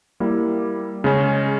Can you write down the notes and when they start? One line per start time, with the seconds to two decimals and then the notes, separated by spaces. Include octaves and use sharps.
0.20 G3 A#3 E4
1.04 C#3 G#3 C#4